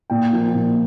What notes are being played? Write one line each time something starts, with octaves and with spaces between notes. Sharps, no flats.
A#2 G5
F3 A#3
A#2